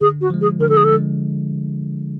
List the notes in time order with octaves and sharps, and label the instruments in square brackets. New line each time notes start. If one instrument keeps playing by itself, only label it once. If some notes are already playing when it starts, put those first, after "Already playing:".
[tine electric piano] D3 [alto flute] G#4
[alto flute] F#4
[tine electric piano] F3 G#3
[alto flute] G#4
[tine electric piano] D3 [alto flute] A#4
[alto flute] A4
G#4
A4
[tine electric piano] F3 G#3